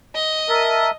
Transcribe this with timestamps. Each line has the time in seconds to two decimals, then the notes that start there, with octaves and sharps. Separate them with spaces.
0.15 D#5
0.49 A#4 E5 A5